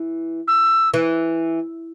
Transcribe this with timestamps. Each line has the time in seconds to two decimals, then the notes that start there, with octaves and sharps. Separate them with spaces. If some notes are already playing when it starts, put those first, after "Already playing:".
Already playing: E3
0.48 E6
0.94 E3